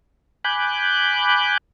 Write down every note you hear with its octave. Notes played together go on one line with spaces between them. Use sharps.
G#5 B5 D6 F#6 G6